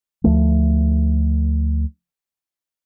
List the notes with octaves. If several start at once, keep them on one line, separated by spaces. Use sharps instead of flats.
D2 F3 A3